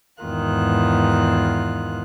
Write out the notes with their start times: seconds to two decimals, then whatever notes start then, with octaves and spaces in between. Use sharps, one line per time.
0.23 E2 G#2 D#3 F4 F#6